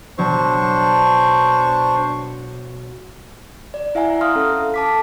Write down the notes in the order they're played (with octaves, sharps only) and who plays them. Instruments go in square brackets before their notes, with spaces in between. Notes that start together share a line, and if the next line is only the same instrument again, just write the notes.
[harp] B1 F#3 [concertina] D4 C5 C#6
[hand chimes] D5
E4 E5 F#5 G#5 A#5
F5 A#5 C6 D#6 F6
C#4 A4
A5 D6 B6